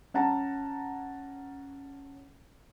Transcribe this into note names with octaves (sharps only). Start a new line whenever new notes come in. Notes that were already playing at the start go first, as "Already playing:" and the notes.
C#4 F#5 A5 A#5